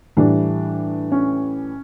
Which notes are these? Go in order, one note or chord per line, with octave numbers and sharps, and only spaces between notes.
A2 E3 G3 D4
C#4